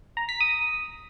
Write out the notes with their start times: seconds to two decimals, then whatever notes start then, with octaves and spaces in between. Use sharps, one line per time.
0.17 A#5
0.29 B6
0.41 D#6